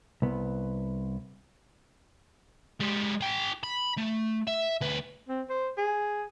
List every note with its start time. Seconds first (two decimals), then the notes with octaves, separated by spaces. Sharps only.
0.22 C2 B3
2.81 G#3 G4
3.21 G#4 G5
3.63 B5
3.97 A3
4.47 E5
4.81 D2 B4
5.29 C4
5.50 C5
5.78 G#4